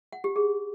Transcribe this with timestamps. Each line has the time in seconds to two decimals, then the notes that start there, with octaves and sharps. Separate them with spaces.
0.12 F#5
0.24 G4
0.36 G#4